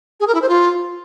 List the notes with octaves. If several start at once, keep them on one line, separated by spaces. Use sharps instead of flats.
G#4
A#4
E4
C5
F4